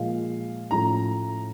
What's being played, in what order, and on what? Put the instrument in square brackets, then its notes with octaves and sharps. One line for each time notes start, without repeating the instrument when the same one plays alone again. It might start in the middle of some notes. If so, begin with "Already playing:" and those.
Already playing: [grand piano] A#2 F3 G#3 F5
A2 F3 A3 C#4 A#5